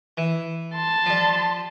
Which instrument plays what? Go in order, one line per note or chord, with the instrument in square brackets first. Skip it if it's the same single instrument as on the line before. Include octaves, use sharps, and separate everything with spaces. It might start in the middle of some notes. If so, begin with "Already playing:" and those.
[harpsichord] E3
[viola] A5 C6
[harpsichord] F3 G3